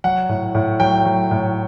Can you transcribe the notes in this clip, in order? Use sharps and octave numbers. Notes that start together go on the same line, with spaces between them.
F#3 F#5
A2
A2
F#3 G5
F#3
A2